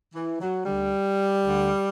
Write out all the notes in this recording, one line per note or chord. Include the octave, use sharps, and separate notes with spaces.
E3
F#3
D2 D3 G3
D2 D3